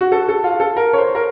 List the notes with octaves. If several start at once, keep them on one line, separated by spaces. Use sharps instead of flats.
F#4
A4
A4
F4
A4
A#4
C#5
C5
A#4